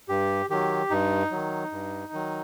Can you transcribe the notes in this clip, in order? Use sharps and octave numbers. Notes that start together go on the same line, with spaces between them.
G2 G4
D#3 F#3 G4
G2 D#4
D#3 F#3
G2
D#3 F#3